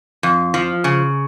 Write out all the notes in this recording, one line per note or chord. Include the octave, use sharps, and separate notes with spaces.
F2
F3
C#3